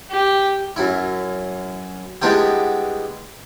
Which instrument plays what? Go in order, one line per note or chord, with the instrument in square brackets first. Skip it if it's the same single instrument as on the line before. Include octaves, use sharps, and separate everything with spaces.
[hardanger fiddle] G4
[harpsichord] F#2 E4
G3 G#3 B3 D4 E4 G4